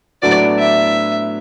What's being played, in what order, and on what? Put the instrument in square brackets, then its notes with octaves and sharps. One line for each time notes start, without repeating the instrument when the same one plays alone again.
[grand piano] A2 F#3 B3 D4 F#4 [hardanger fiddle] D5
[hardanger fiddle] E5